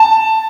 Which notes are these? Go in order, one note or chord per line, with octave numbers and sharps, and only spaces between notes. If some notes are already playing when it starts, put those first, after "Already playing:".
Already playing: A5